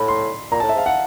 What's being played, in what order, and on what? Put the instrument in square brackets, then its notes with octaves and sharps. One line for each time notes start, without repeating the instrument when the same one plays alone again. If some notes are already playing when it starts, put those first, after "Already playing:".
Already playing: [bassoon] A2 [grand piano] B5
[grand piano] C6
[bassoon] A#2 [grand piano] A#5
[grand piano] A5
[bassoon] A2
[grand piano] E5
[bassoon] G#2 [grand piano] F5
[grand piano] F#5